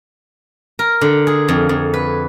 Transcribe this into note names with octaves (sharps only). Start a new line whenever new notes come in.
A#4
D3
G#4
F2
F2
B4